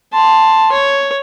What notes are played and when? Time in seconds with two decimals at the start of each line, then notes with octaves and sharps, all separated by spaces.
0.13 A5 C6
0.72 C#5